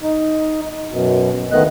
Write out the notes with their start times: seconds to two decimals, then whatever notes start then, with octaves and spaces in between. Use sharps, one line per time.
0.03 D#4
0.91 F#2 B2
1.52 D2 D#3 A3 B3 D#5 F#6